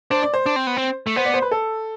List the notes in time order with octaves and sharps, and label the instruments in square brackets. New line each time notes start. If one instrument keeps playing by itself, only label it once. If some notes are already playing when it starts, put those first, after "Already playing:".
[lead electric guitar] D4 [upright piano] C5
[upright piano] D5
C5
[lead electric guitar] D4
C4
B3
C4
A3
[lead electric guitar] B3 [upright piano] C5
[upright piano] D5
C5
B4
A4